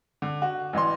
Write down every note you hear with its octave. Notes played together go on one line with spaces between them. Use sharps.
D3
F#4
A1 E3 D5 C6